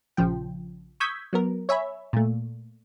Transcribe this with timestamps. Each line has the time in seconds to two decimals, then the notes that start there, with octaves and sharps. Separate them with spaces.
0.17 A#1 C#3 F3 G5
1.00 C#6 D#6 E6 G6 G#6 B6
1.33 F#3 B3 A#4
1.69 C#5 E5 G#5 B5
2.13 A#2 A3